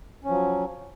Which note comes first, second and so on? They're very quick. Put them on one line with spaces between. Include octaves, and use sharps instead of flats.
C#4 F3 F#3